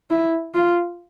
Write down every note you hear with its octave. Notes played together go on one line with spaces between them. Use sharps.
E4
F4